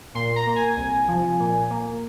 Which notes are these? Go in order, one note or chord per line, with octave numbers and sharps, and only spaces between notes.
A#2 C6
A#5
A#3
G#5
C2
C3 F3
A#2
A#3